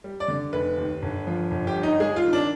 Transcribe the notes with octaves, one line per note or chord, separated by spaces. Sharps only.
G3
D5
D3
F1 B4
D#2
G1
F3
G1
G4
G2
D#4
G#3 G#4
F4
D#3
D4